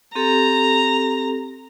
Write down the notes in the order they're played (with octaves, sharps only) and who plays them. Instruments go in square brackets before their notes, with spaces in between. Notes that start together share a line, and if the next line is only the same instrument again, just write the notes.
[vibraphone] C4 G4 A4 [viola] A#5